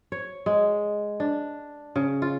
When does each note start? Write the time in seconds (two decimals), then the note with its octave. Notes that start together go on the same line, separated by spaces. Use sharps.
0.12 C#5
0.46 G#3
1.20 D4
1.96 C#3
2.22 F4